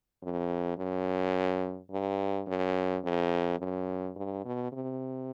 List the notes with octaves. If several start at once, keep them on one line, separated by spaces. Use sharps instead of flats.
F2
F#2
G2
F#2
F2
F#2
G2
B2
C3